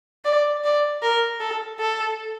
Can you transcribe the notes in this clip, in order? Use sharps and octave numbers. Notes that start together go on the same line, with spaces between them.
D5
D5
A#4
A4
A4